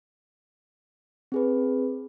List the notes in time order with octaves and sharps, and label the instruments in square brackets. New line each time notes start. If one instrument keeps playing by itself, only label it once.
[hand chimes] C4 G#4 B4